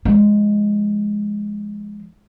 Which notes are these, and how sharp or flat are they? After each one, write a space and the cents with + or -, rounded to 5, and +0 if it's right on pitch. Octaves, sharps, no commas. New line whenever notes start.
F3 -15 G#3 +0